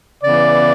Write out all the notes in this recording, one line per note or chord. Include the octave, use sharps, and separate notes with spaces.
C#3 E3 B3 D5